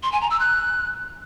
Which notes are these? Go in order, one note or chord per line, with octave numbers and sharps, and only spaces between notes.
C6
G#5
A#5
E6
F#6